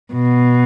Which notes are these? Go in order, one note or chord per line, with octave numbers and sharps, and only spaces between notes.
B2